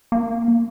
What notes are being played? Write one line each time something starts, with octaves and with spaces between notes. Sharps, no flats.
A#3